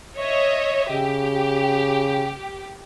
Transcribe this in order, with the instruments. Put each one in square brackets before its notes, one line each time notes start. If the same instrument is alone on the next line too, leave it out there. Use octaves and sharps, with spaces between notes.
[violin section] C#5 D#5 E5
[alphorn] C#3 [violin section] G4